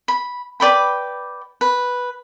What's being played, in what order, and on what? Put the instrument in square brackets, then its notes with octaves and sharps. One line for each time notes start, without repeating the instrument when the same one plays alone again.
[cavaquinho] B5
B4 D5 G5 B5
B4